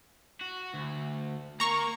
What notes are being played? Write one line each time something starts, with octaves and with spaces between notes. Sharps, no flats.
F#4
D2
A#3 A#5 C#6